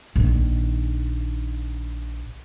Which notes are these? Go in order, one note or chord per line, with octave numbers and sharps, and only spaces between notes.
A#1 D#3